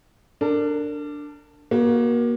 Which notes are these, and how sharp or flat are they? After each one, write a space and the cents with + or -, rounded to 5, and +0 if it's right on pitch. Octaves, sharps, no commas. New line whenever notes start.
D4 +0 A#4 -35
A#3 +30 F#4 +20